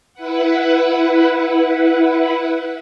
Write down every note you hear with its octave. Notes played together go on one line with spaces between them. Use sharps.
E4 B4 F#5